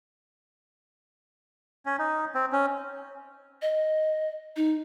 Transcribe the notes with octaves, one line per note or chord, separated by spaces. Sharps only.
C#4
D#4
C4
C#4
D#5
D#4